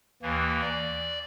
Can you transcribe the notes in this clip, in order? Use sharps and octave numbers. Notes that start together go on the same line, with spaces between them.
D#2 E3 A#3
D5